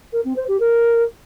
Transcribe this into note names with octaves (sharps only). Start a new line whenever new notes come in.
A#4
C4
C5
G4
A#4